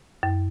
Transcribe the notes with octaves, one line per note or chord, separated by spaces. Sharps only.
F#2